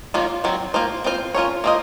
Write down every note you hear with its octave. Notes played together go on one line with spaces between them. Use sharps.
D#3 F#3 A#3 F4
D#3 F#3 C4
A#3 F4 C5
C4 F4 C5
C#4 F4 A#4 C#5
A#3 F4 A4 C5 D#5